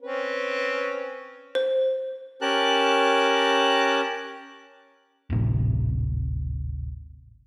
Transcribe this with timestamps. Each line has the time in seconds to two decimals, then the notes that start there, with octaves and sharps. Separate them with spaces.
0.02 C4 C#4 B4
1.55 C5
2.41 C#4 G4 A#4 A5 F#6
5.30 D1 G#1 A2 C3